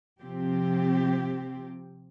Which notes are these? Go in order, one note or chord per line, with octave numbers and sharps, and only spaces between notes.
C3 F3 C4 G4